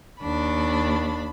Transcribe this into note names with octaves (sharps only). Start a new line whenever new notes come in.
D#2 D4 B5